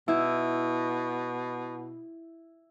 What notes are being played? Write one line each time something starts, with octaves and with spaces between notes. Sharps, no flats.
B2 E4